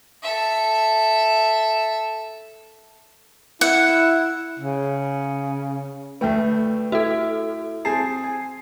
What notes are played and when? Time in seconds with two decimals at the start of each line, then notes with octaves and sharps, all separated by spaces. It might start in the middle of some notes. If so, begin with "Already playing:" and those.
0.23 A4 E5
3.61 E4 F#5
4.59 C#3
6.21 D2 A3 B4 G5
6.92 E4 F#4 A4 E5
7.85 C4 G#4 A5 C7
8.24 G#5